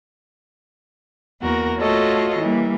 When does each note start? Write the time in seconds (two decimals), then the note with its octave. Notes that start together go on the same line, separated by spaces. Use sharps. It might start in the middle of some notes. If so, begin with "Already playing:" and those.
1.42 E2 A#3 F#4 A#4
1.79 A3 F4 F#4 A4 C#5 D#5
2.39 E3 G3 A#3